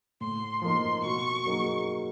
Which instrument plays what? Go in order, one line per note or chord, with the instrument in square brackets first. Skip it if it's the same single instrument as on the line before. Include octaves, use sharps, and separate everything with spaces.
[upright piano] A2 [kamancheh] C6
[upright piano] F3 A#3 D#4 [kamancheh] C6
[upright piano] B2 [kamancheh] C#6
[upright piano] F#3 A#3 D#4 G#4